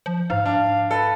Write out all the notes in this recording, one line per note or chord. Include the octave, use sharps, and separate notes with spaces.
F3
G#2 F5
D4 F5
A4 B4